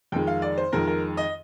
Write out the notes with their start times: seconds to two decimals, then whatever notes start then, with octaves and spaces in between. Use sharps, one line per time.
0.12 F2 D#3 G#3 G5
0.27 F5
0.42 D5
0.58 C5
0.72 F2 D#3 G#3 A#4
0.87 A#4
1.17 D#5